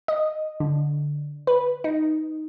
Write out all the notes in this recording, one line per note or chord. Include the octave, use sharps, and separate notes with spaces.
D#5
D3
B4
D#4